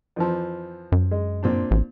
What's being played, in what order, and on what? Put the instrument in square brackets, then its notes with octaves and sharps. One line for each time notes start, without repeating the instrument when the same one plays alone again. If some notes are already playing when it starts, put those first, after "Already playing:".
[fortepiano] F2 E3 F3
[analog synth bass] F#2
[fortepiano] G#3
A#2 C4 D4
[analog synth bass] A1